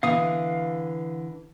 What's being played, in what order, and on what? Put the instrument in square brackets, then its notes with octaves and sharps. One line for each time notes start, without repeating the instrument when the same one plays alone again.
[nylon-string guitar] D3 E3 B3 [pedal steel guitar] F5 D#6